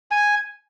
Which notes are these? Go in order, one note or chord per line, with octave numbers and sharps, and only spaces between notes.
G#5